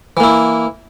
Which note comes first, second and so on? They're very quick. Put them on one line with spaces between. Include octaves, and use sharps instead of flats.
E3 A#3 E4